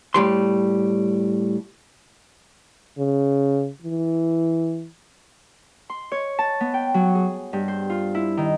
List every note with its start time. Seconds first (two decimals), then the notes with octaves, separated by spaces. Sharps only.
0.14 A2 G3 C6
2.98 C#3
3.82 E3
5.90 C6
6.12 C#5
6.39 A5
6.61 B3
6.74 G5
6.94 F#3
7.15 G#4
7.53 G2
7.68 C5
7.90 F4
8.15 E4
8.37 D#3